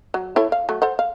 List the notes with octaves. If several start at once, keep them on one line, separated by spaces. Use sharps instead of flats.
F#3
E4 A4 C#5
F5
F#3 A3
A4 C5 F#5
F5